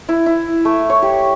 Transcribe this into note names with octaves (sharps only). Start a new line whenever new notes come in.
E4
E4
A3
C#5
G4